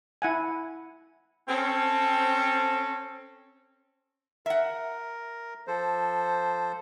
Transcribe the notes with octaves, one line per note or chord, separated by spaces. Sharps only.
E4 F#5 G#5
C4 C#4 A4
A#4 E5 F#5
F3 A4 C5